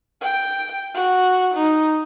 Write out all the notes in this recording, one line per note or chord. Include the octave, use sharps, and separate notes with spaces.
G5
F#4
D#4